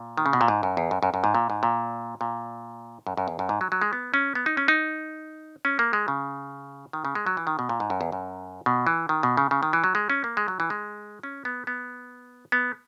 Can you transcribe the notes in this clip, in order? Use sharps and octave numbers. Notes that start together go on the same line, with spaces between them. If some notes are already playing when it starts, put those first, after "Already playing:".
Already playing: A#2
D#3
C#3
B2
A#2
G#2
F#2
E2
F#2
F#2
F#2
G#2
A#2
G#2
A#2
A#2
F#2
F#2
E2
F#2
G#2
F#3
F#3
G#3
B3
C#4
B3
D#4
C#4
D#4
C#4
A#3
G#3
C#3
D#3
C#3
G#3
F#3
E3
D#3
B2
A#2
G#2
F#2
E2
F#2
B2
E3
D#3
B2
C#3
C#3
D#3
E3
F#3
G#3
C#4
A#3
G#3
F#3
E3
G#3
C#4
B3
B3
B3